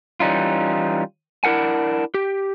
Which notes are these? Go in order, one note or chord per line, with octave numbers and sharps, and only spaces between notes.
E3 G3 C#4 D#4 F4
D4 E4 A#4 F#5 G#5
G4